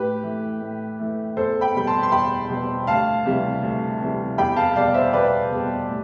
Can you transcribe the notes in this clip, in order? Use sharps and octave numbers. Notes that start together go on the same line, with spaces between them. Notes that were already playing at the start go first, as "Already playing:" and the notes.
Already playing: A2 G4 B4
E3 A3
A2
E3 A3
E2 A4 C5
G5 B5
B2 G3 B5
A5 C6
C6
E2 G5 B5
B2 G3
D2 F5 A5
C3 E3 G3
D2
C3 E3 G3
E2 G5 B5
F5 A5
B2 G3 D5 F5
C5 E5
E2 B4 D5
B2 G3
A2